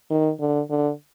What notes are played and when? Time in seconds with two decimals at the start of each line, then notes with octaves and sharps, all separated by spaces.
0.10 D#3
0.40 D3
0.70 D3